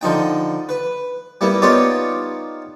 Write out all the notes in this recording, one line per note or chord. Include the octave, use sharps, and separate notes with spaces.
D3 F3 D#4 G5
B4
G3 A#3 B3 E4
B3 D#4 F4 G4 C#5 D5